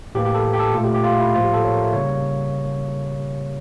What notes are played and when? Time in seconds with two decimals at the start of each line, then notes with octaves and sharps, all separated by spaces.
0.15 A2 E3 A#3 G4
0.25 G4
0.34 A4
0.53 G4
0.60 A4
0.74 A#2 A3 F4
0.84 G4
0.94 G4
1.04 F4
1.19 E4
1.34 A2 F3 A#3 F4
1.44 G4
1.54 A4
1.64 C#5
1.74 A#4
1.83 E5
1.93 C#3 G3 A#3 C#5